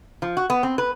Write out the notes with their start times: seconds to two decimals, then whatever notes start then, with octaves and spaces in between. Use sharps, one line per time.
0.22 F3
0.37 F#4
0.50 B3
0.63 C4
0.78 B4